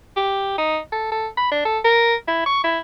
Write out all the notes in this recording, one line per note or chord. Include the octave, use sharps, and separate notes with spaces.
G4
D#4
A4
A4
B5
D4
A4
A#4
E4
C#6
E4